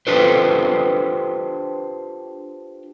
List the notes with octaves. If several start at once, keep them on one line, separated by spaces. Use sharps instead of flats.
D4 F4 G4 A4 B4 C5